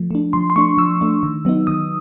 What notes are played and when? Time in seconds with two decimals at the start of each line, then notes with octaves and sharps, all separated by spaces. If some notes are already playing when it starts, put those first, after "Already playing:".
Already playing: F3 A3
0.11 A3 D4
0.33 F3 C6
0.50 C6
0.56 A3 D4 C#6
0.78 F3 E6
1.01 A3 D4
1.23 D#3
1.45 F#3 B3 D#4
1.67 D#3 D#6